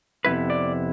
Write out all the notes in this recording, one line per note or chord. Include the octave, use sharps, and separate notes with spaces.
F2 C3 F3 B3 E4 B4
D5